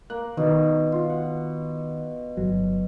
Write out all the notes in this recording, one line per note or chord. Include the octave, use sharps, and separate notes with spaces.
A#3 F#6
B2 D#3
F4
F#5
G1 F#3